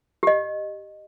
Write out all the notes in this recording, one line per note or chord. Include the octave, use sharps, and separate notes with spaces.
G4 D#5